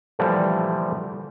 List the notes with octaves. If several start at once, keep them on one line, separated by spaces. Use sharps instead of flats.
A#2 D3 E3 F3 G3 A3